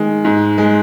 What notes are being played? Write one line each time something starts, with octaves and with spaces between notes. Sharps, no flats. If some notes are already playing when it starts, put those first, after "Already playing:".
Already playing: D#3 G#3
G#2
G#3